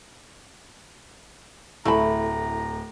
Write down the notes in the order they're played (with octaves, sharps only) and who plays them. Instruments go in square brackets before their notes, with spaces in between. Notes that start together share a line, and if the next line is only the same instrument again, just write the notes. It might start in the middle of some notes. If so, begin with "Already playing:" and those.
[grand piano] D1 [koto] A3 [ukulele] E4 B5 [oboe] A#5